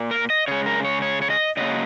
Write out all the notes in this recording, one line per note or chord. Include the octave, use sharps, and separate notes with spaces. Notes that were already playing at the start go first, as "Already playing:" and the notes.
Already playing: A#2 A#3
A#4
D#5
C#3 G#3 C#5
A#4
C#5
C#5
C#5
D#5
C#3 F#3 A#3 D#5